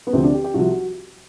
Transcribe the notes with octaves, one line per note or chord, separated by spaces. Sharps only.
B3
D2 C3 F3 C4
D4
G4
G4
C2 C3 F3 F#4